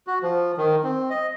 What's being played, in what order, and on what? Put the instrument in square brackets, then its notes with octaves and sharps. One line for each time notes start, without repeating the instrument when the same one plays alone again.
[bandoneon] F#4
F3
D#3
C4
D#5